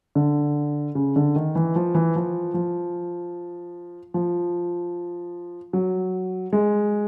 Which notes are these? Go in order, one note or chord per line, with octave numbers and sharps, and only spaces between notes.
D3
C#3
D3
D#3
E3
F3
E3
F3
F3
F3
F#3
G#3